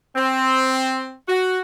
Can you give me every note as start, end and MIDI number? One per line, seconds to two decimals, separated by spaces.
0.16 1.14 60
1.28 1.60 66